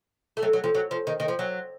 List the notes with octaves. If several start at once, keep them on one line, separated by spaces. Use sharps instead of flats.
A3
F#3
F#3
F3
F#3
F3
D#3
D#3
F3
F#3